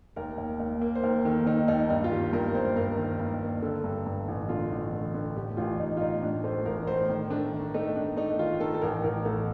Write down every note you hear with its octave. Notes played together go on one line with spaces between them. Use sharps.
D#2 A#4
D#2
D#2
A#3
C5
D#2 A#4
D#3 A4
D#3 D#4
D#2 D#4
G2 D#4
F4
D#3 G4
G2 A#4
G2 C5
G2 A#4
D#3
G2
A#3
D3 A4
G2
G2
A1
D3 F4
A1
D3
D3
A2 G4
A1 F4
A1 D#4
F4
A2 D#4
A2 D4
A3 C5
A1 A#4
A2 C5
D#3
A3 D4
D#3
A3 D#4
A3 D4
A3 D#4
D#3 F4
D#3 A4
A4
A1 A#4
A1 A#4
A1 A4